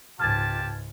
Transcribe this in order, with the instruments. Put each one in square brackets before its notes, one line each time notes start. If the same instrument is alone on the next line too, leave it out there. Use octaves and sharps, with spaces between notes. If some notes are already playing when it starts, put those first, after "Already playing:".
[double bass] C#2 G#2 [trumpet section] F4 G4 A5 [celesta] F6 G#6 A6